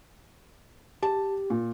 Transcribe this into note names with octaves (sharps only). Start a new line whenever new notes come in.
G4 A5
A#2